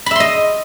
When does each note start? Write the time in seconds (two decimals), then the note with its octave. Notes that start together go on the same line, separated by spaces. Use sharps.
0.06 B5
0.11 E5
0.15 C6
0.20 D#5